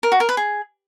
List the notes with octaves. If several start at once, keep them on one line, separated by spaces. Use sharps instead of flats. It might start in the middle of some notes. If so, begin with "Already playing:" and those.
A#4
F#4
A#4
B4
G#4